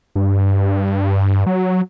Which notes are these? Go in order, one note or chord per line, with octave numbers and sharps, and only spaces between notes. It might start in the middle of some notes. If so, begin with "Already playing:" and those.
G2
F#3